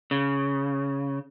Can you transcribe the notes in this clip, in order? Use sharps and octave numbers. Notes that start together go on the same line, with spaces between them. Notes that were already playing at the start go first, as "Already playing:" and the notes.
C#3